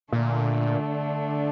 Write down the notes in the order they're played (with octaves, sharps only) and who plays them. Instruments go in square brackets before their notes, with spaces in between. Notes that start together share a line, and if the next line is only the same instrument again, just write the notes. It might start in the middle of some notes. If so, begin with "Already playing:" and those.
[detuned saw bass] A#2 [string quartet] D3 A3 D4